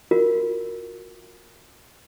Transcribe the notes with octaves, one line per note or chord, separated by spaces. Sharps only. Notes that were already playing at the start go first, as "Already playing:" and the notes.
F4 F#4 A#4